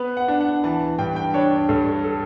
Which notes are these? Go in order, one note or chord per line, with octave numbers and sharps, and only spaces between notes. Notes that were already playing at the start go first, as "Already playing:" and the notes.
Already playing: B3 B4
F#5
D4
F#5
E3 A5
G2 G5
G5
D4 C#5
G2 A4
A4